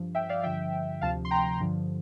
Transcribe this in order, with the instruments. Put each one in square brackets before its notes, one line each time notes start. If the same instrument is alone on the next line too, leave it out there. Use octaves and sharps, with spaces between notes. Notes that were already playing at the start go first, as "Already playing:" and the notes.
Already playing: [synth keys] G2 F3
E5 G5
D5 F5
G2 D3 F3 E5 G5
D2 C3 F3 F5 A5
C6
G5 A#5
G2 D3 F3